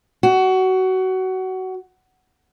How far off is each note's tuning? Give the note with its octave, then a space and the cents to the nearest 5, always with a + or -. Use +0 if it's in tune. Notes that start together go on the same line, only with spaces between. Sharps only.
F#4 +20